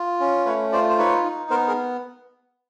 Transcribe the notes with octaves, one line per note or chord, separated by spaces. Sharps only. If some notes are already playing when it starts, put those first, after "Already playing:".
Already playing: F4
C#4
A3 B4 C#5
F4 C5 D5
C5
D#4 B4 C#5
D#4
B3 A#4 C5
G#4 A#4